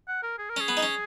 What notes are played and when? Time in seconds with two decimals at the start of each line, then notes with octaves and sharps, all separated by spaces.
0.08 F#5
0.23 A#4
0.38 G#4
0.49 A#4
0.57 C#4 G#4
0.68 B3
0.77 D#4
0.83 C#4